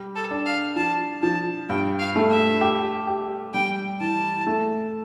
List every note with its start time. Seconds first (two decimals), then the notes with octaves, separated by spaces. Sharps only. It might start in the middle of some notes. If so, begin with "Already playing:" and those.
Already playing: G3 G4
0.15 A4
0.31 D4
0.46 F5
0.76 F3 A5
1.23 F3 A5
1.69 G2 G5
1.99 F5
2.16 A3
2.30 E5
2.61 G4
3.07 G4
3.53 G3 G5
4.00 E3 A5
4.47 A3